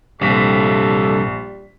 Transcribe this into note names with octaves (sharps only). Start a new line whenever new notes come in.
A#1 G2 C3 G3 A4 D6 B6